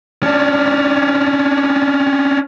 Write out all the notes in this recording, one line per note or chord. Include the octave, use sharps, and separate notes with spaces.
C#4 D4